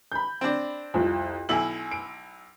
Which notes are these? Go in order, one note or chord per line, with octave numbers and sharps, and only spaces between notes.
B5 G6
C4 D4
C2 F2
B1 E4 G#5 F#7
D7